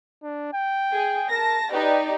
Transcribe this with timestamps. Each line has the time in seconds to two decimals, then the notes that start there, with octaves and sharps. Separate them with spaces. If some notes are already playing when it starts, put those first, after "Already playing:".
0.23 D4
0.53 G5
0.94 G#4
1.30 A#4 A5 A#6
1.72 D#4 G4 B4 D5